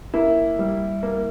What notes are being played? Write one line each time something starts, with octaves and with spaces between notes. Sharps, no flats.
A#3 E4
G3
A#3